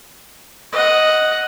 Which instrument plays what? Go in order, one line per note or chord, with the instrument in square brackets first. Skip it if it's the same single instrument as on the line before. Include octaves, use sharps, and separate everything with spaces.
[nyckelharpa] D#5 F#5